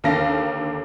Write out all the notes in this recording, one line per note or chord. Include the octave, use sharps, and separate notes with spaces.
D#2 D3 A#3 A4 F5 A#6